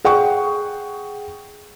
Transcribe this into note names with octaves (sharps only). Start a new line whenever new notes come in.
G#4 F#5 G5 C#6